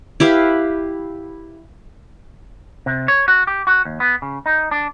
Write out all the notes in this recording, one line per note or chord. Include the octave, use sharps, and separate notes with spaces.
E4 G4 B4 F5
C3
C#5
F#4
G4
F#4
D#2
B3
C#3
D#4
D4